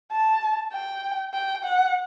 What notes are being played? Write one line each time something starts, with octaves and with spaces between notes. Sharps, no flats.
A5
G5
G5
F#5